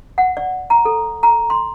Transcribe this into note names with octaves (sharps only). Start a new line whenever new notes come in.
F#5
D5
A#5
A4
A#5
C6